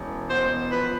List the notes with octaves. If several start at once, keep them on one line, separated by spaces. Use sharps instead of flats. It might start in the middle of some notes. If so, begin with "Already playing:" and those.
Already playing: E1 C#4
B2 C5
F3 B4